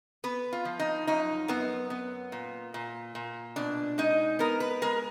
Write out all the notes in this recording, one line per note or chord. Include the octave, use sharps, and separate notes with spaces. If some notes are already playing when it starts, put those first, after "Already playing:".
B3 B4
F4
F3
D#4
F#2 D#4
F#2 B3
B3
A#2
A#2
A#2
B2 D4
G#3 D#4
B3 A#4
B4
G#3 A#4